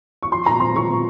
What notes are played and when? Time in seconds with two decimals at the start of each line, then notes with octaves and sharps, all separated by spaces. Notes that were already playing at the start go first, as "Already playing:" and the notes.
0.23 C#6
0.32 F3 C6
0.46 A#2 A#5
0.60 C4 C6
0.76 A#2 C#6
0.90 C4